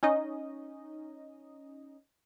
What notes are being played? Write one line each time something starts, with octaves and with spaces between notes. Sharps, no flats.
C#4 D#4 D#5